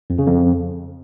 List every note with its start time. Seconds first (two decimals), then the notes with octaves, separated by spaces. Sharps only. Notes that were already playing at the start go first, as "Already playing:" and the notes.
0.10 F2
0.19 C#3
0.27 F2